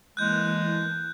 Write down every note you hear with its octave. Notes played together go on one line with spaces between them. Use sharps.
E3 G#3 A#3 A5 F#6 G6